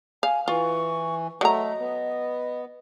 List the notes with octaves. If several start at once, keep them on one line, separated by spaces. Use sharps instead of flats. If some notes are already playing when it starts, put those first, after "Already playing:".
F5 G#5
E3 F4 C#6
F#3 A3 D#5 A#5
B3